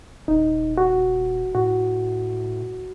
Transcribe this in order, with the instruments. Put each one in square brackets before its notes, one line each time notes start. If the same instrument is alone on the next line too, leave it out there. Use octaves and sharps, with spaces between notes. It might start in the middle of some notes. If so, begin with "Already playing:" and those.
[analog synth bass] D#1 [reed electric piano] D#4
[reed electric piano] F#4
[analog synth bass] A2 [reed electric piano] F#4